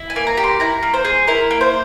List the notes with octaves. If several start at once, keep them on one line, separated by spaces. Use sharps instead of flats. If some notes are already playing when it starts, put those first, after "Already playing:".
Already playing: E4
G#5
A#3
A#5
G4
C6
E4 A#5
A#3
C5
G#4
E4 A#4
A#3
C5